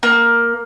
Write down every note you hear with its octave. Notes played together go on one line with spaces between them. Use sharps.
A#3